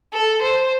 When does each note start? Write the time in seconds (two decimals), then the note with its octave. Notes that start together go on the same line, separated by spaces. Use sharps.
0.13 A4
0.43 C5